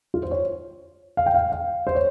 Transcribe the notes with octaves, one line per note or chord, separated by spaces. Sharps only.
F4
C5
C#5
F5
G5
F5
F5
C5
C#5